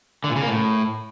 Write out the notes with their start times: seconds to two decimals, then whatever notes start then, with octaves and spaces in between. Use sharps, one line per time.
0.24 D3
0.30 A#2
0.36 C#3
0.42 A#3
0.48 A2